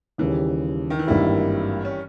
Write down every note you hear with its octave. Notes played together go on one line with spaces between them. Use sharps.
D#2 C#3 E3 G3
D#3
E3
G#1 G2 D#3 G3 A#3 E4
C#4